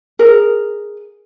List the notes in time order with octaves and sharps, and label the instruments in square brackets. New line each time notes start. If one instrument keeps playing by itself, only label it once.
[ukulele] G#4 A#4